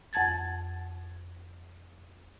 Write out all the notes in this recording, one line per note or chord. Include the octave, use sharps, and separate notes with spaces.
F2 F#5 A5 G#6 A6